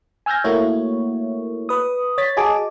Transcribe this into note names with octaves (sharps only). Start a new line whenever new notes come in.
G#5 E6 F6 G6 G#6 A#6
A3 A#3 E4 F#4 C#5
B4 D#6
C#5 A6 B6
F#4 G#4 D#5 G#5 A5 D6